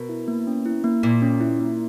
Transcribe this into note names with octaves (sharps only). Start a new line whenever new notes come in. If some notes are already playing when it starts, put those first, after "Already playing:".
Already playing: B2 A#4
E4
A#3
C#4
E4
A#3
A#2 A#3
C#4
E4
A#3